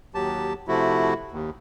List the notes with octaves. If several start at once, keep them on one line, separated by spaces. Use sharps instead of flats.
D#2 F#3 G4 A5
C3 F3 A3 E4 F#4
D#2